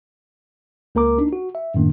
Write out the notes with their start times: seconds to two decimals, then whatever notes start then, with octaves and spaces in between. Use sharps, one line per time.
0.95 C#2 A#3 A#4 A#5 D6
1.18 D4 D#4
1.33 F#4
1.55 E5
1.74 F#2 A2 D#3 A#3 D4